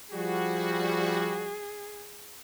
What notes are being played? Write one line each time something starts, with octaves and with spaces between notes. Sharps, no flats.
F3 G3 F#4 G#4